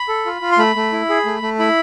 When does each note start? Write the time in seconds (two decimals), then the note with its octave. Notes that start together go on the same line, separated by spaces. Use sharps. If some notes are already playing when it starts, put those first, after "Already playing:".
Already playing: B5
0.09 A4
0.26 F4
0.41 F4
0.52 C6
0.58 A3 B5
0.76 A3
0.92 E4
1.10 G#4
1.26 A3
1.42 A3
1.59 E4 B5